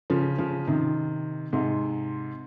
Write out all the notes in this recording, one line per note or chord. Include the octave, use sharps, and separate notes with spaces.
C#3 F3
C#3 F3
C3 D#3
G#2 C3